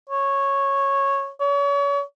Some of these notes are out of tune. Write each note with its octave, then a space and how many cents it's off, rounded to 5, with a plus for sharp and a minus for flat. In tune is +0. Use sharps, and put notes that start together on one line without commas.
C#5 -10
C#5 +35